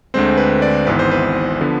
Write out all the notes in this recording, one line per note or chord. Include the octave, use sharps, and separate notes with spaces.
D2 D3 G#3 C4 C5
B4
D5
G#1 G#2 E3 B3 B4
C5
B4
D3 F3 B3 D4